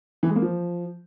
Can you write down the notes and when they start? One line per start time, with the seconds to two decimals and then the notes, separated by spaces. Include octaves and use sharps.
0.23 E3
0.29 G#3
0.36 A#3
0.42 F3